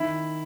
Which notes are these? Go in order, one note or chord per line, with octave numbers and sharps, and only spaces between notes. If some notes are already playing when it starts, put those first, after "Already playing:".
Already playing: D#3 E4